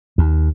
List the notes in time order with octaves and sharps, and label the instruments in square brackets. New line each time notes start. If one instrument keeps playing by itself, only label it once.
[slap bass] D#2